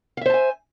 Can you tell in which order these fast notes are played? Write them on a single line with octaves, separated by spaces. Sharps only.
F5 E5 C5 A5 G#5